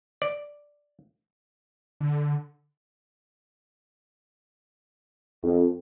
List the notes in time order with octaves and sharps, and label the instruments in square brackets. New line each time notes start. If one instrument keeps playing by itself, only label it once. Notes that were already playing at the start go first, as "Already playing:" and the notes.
[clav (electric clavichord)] D5
[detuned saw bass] D3
[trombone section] F2